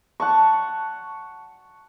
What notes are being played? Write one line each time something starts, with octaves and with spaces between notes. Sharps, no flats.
F#5 A5 C#6